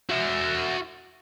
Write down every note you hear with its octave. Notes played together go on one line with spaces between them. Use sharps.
F#4 E5